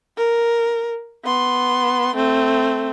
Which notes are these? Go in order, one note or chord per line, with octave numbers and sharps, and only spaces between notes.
A#4
B3 C6
A3 C4